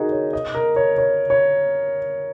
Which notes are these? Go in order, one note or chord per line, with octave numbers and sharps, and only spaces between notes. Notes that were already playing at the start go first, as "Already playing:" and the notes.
Already playing: D#4 F#4 G#4 A#4
C#5
D#5
A#4
C#5
C#5
C#5